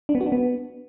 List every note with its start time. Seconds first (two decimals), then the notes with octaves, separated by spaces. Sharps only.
0.09 D4
0.15 B3
0.21 F#4
0.26 D4
0.32 B3